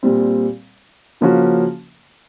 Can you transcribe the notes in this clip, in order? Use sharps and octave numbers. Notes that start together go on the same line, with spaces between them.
A#2 G3 C4
C#3 F3 A#3 C#4 F#4